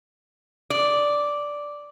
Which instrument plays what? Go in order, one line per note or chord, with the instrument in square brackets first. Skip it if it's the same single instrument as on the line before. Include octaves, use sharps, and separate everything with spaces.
[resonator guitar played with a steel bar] D5